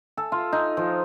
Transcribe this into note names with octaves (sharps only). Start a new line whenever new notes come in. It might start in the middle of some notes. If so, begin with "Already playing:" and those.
A4
F4
D#4
F3